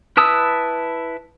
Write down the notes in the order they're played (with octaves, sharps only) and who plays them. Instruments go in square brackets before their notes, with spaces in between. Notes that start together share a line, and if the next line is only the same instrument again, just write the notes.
[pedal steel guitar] E4 B4 A5 D#6 E6